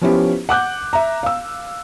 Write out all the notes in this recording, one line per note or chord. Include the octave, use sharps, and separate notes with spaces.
F3 B3 C#4 E4 F4 G4
F#5 D6 F#6 G6
E5 A#5
F5 E6